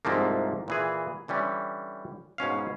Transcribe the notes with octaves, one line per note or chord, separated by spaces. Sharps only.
C2 G#2 F3 A3 A#3
A#2 E3 G#4
D3 E3 G3 C#4
G#2 B2 C#4 F5